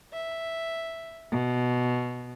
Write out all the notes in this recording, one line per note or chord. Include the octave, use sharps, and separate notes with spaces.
E5
B2